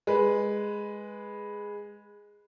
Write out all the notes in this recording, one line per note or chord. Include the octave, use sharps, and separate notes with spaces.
G#3 B4